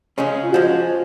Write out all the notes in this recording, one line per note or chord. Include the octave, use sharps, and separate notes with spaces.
C#3 G#3 C#4
F4
F3 G#3 F#4